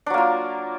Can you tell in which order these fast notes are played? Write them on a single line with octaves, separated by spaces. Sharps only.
D4 F#3 A#3 F4